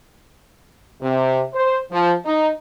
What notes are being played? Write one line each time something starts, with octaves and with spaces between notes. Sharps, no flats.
C3
C5
F3
D#4